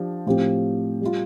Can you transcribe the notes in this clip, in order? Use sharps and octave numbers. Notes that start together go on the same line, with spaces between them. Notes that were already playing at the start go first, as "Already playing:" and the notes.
Already playing: F3 D4 G4
A2 F3 C4 G4
G3 F4